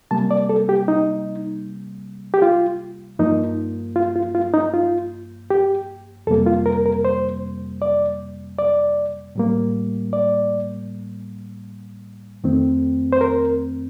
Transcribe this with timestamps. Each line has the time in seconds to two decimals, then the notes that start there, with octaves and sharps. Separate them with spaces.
0.11 C3 G3 A#3 A5
0.31 D5
0.49 A4
0.69 G4
0.88 D#4
2.34 G4
2.42 F4
3.19 G2 F3 A#3 D#4
3.96 F4
4.16 F4
4.35 F4
4.54 D#4
4.74 F4
5.50 G4
6.27 F2 C3 G3 A#3 A4
6.46 F4
6.66 A#4
6.86 A#4
7.05 C5
7.82 D5
8.58 D5
9.36 A2 G3 A#3
10.13 D5
12.44 F2 D#3 A3 C4
13.13 C5
13.21 A#4